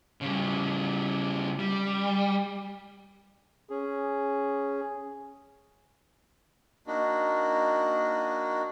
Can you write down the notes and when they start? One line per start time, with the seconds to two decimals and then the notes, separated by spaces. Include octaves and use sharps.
0.21 C#3 G3
1.59 G3
3.70 C#4 G#4
6.87 A#3 D4 D#4 F#4